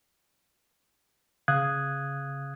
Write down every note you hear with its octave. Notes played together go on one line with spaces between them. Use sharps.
C#3 F5 D#6 F#6 G#6